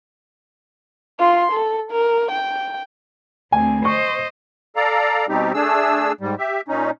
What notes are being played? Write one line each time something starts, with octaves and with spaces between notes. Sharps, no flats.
F4 C6
A4
A#4
G5
D2 C4 G#5
C5 D#5 C#6
A4 D5 F5 A#5
B2 G3 C4 D#4 G4
A3 D4 G#4 E6
G#2 G3
G4 E5
A#2 C#4 D#4